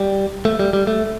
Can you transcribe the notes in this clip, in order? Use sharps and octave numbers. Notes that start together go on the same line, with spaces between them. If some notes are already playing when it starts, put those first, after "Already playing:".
Already playing: G3
A3
G3
G3
A3